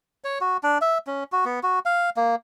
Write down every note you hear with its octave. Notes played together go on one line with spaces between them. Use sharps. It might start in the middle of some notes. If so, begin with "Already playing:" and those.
C#5
F#4
D4
E5
C#4
F#4
B3
F#4
F5
A#3